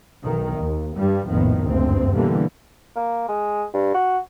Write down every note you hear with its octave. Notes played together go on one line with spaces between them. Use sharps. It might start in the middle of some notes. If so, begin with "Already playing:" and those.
B1 D#3
D#2
G2 G3
A#1 F2 A2 D#3 B3
F#1 D2 G2 C4
B2 D3 E3 G3 A#3
A#3
G#3
G2
F#4